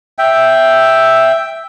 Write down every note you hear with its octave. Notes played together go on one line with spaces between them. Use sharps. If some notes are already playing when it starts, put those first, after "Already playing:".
E5 G5